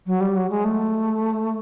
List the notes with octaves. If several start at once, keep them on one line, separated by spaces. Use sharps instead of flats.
F#3
G3
F#3
G#3
A3